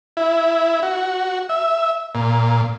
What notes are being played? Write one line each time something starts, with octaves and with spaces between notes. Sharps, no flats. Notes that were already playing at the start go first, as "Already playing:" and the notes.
E4
F#4
E5
A#2